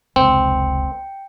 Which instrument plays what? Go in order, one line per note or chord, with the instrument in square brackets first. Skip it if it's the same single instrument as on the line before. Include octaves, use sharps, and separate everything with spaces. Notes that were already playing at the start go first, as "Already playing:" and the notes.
[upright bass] F1 C#2 [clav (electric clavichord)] C4 [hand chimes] G5